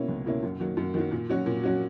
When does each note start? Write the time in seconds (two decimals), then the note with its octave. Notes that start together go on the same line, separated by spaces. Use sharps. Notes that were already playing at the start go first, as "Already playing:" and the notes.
Already playing: B2 A#3 C#4 E4
0.09 C#2
0.26 B2 A#3 C#4 E4
0.43 F#2
0.60 D#3 F#3 A#3
0.77 F#2
0.94 D#3 F#3 A#3
1.11 A#2
1.30 F#3 C#4 F#4
1.46 A#2
1.64 F#3 C#4 F#4